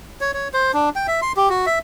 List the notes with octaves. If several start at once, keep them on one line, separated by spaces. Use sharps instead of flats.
C#5
C#5
C5
D4
G5
E5
C6
G4
F#4
E5